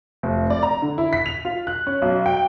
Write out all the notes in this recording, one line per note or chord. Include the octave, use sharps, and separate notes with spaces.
F1
D5
A#5
D3
E4
B6
F7
F4
F#6
C#4
B1
G5